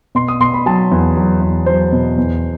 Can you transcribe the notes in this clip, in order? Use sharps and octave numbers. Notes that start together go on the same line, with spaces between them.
B2 C6
D#6
B2 C6
B5
F#3 A5
E2
F#3
E2
F#3 C5
B2
E2